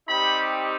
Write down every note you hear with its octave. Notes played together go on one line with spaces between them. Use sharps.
G3 C4 D#4 G4 B5